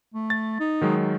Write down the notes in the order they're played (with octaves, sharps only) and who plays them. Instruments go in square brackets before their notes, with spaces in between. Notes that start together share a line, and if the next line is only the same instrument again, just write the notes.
[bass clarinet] A3
[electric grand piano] A6
[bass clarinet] D#4
[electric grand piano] D#3 F#3 G#3